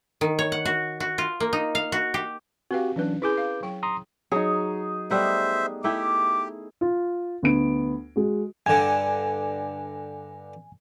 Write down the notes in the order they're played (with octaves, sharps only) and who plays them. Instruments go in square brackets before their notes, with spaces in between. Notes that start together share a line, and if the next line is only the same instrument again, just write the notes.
[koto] D#3
C#5
F#5
F#4
F#4
F4
A#3
D#4
F5
F#4
G4
[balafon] C4 B4 F5 [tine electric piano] F#4 G4
[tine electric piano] E3 F#3 D4 [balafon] C#4 B4
[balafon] E4 G#4 G#5 [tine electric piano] B4 D6 G6
[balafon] F5
F#3 G5
[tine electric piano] A#5 C6 D#6
[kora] F#3 C#5 [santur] D#4 G#4
[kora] G3 A3 B3 [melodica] C5 E5
[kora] A3 E4 G5 [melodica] G4 [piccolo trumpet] D6
[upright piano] F4
D2 B3 D7
G#3 F#4
[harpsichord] G2 D3 [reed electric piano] G#5